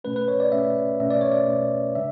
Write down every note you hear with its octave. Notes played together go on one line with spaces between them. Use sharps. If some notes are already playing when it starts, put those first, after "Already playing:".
B2 A3 C#4 B4
B4
C#5
D5
B2 A3 C#4 E5
B2 A3 C#4 E5
D5
C#5
D5
B2 A3 C#4
C#3 G#3 D4 E5